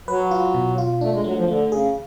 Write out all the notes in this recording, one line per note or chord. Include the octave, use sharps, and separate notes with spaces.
F#3 B4
F4
B2
F4
A3 D4
G#3
F#3 A3
F3
D3 A3
C#3 G#4